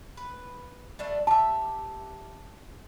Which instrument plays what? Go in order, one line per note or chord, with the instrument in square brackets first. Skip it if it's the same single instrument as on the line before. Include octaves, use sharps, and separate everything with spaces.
[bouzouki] B4
G3 A3 D4
[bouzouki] G4 E5 [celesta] A5